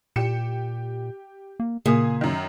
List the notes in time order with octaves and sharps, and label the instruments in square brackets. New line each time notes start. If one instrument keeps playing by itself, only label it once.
[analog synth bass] A#2 [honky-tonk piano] G4 C#7 E7
[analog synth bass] A#3
[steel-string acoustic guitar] A#2 [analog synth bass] C#3 [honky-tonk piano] G#4 D#6
[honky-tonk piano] F#2 D#3